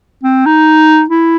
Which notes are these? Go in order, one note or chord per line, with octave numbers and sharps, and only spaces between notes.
C4
D#4
E4